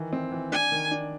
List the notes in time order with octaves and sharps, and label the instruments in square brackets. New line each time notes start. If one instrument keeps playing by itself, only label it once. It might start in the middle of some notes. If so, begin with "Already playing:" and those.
Already playing: [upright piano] D#3 E3
C4
E3
[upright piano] D4 [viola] G#5
[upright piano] D#3
D4